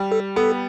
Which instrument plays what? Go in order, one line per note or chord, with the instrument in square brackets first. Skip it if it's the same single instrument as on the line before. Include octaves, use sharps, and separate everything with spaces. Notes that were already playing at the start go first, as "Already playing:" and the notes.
Already playing: [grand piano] G3
[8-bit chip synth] A4
[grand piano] B3 [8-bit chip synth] A4